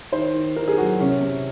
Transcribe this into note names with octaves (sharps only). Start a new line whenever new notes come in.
D#3 C5
D#3
D#3 A#4
G#4
F#3 F#4
C3 C#4
C3